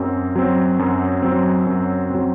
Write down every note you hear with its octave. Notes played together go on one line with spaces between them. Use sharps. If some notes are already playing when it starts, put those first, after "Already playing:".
Already playing: F#2 F#3 C4
F#3 C4
F#2
F#3 C4
F#2
F#3 C4